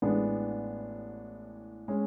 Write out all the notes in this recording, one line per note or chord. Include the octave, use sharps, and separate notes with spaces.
A1 A2 G#3 B3 D4
G#3 C#4